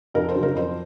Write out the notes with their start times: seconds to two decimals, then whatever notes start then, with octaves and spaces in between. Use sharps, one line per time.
0.14 F2 A#4
0.29 C5
0.35 C#3 F#3
0.43 A#4
0.55 F2 C5